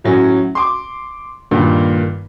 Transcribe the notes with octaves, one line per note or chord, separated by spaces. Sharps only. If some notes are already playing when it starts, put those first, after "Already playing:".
A2 F#3 C#4
C6 D6
G2 A#2 D#3